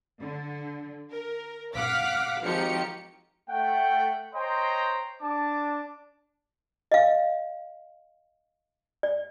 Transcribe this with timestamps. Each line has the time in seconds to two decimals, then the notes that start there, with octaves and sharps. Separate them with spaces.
0.21 D3
1.11 A#4
1.75 F5 F#5 D6 F6 B6
2.42 G#1 F3 D#4 F#4 G4 C#7
3.49 A3 F#5 G5
4.34 C5 C#5 D#5 G5 A#5 C6
5.22 D4 A5 D6
6.92 D#5 F5
9.03 D5